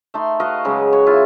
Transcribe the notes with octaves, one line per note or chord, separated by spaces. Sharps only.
A3 D#4 C6
F#4 B4 D#5 F5
C#3 F#3 G#3
C#5
E4 F4 G#5